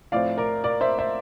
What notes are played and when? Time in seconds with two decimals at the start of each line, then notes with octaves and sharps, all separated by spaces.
0.12 A2 F3 C4 D5 F5
0.38 A#4 D5
0.64 A#4 D5
0.81 C5 E5
0.99 C5 E5